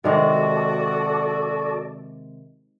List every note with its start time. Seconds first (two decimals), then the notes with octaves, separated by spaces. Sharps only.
0.04 C3 D#3 G#3 F#4 A4 D5